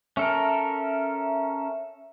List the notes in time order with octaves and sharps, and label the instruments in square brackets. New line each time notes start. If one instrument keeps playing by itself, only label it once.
[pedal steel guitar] C#4 A4 A#4 [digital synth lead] E5